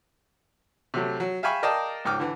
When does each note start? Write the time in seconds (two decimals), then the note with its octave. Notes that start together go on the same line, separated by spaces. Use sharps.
0.94 C3 F#3 A3
1.20 F#3
1.43 E5 F5 G5 G#5 B5 C#6
1.63 A#4 D5 D#5 F5 G5 A5
2.05 C#2 G#2 G5 D6 F6
2.20 D3 E3